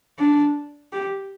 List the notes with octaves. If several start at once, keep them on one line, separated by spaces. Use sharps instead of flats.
D4
G4